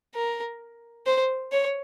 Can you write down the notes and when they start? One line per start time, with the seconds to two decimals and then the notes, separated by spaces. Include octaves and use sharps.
0.15 A#4
1.06 C5
1.52 C#5